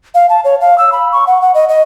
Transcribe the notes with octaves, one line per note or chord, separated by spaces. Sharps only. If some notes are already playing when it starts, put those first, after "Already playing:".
F5
A5
C#5
F5
E6
B5
C#6
F#5
F#5
D#5
D#5